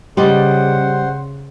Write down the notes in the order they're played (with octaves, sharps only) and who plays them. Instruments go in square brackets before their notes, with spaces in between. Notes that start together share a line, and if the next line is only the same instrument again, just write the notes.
[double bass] C#3 [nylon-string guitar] G3 D5 D#5 [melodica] C5 F#5 C6